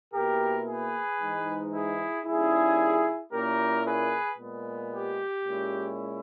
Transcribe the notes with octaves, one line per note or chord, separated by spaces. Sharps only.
B2 A#3 E4 G4 A#4
G#4 B4
G#2 E3 G#3 D#4
E4 G#4
D#2 D#3 G3 C#4 E4 G#4
A#2 A#3 C#4 E4 G4 A#4
G#4 B4
A#2 G#3 B3
G4
A#2 G#3 C#4 E4